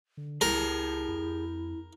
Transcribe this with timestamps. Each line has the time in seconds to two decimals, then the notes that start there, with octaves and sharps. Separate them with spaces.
0.17 D3
0.41 C#2 E4 G4 G#4 A#4 A5
1.08 F2